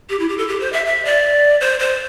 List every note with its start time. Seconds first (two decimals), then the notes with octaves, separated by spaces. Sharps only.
0.10 G4
0.20 E4
0.29 G4
0.38 A4
0.48 G4
0.60 C5
0.73 E5
0.86 E5
1.05 D5
1.61 C5
1.80 C5